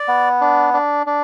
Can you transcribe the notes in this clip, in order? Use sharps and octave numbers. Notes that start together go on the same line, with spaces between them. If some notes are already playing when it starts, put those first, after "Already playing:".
Already playing: D5
B3
D4
D4
D4